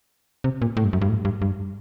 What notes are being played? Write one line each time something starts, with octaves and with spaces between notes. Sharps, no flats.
C3
A#2
A2
G2
F#2
G2
A2
G2
G2